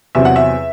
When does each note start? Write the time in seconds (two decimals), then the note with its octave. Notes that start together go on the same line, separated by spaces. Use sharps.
0.15 E2 C3 F#3 C4 E5
0.25 F#5
0.36 E5